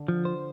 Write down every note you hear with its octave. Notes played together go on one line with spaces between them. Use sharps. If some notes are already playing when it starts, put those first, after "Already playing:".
Already playing: D3
F3
C5